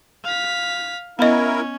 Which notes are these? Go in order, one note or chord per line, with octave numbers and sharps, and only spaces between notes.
F5 B6
B3 C#4 E4 A#4 D#5